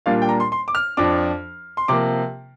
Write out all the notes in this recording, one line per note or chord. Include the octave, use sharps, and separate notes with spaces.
A#2 G3 A#3 D4 F5
G5
A#5
C6
C6
D6
F6
F2 F3 D4 D6
C6
C3 F3 A#3 D6